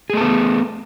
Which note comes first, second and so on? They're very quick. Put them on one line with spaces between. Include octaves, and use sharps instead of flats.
G#4 A3 A4 B3